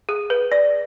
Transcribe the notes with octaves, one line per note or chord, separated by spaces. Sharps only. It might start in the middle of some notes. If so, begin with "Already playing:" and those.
G#4
B4
D5